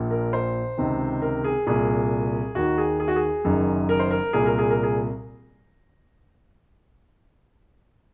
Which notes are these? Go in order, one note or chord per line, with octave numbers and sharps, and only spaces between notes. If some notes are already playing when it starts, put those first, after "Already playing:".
Already playing: A#1 A#2
A#4
C5
C#2 C3 D#3
A#4
G#4
C2 A#2 G#4
D#2 D#3 F#4
G#4
G#4
F#4
G#4
F#1 F#2 D#3
A#4
C5
A#4
C2 A#2 G#4
A#4
G#4
A#4
G#4